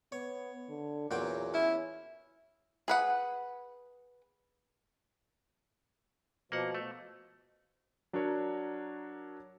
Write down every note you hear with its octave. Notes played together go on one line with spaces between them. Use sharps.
B3 C#5
D3
E2 A#2 F#3 G5
C#4 E4
G#4 B4 F#5
B2 F3 A#3 F#5
A3
F#3 D4 F#4 A#4 C#5